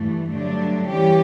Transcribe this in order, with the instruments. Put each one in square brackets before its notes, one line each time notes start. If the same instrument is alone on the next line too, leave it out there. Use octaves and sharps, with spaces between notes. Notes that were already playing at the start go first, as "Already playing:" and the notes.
Already playing: [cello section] G2 E3 A3
G2 D3 F#3 A3 D4
E3 G3 C#4 G4